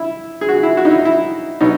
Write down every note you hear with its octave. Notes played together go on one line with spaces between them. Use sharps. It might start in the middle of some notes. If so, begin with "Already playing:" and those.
Already playing: E4
G#4
F#4
E4
F#4
D#4
E4
E4
B2 F#3 D#4